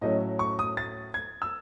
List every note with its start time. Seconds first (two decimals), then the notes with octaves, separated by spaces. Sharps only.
0.01 A2 F#3 A3 C#4 D#5
0.39 C#6
0.59 D#6
0.77 A6
1.14 G#6
1.42 E6